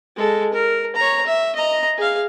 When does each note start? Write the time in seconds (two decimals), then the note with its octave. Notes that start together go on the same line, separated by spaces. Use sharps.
0.16 G#3 A4
0.53 A#4
0.96 C#5 A#5
1.26 E5
1.56 D#5 A#5
1.98 G#4 F5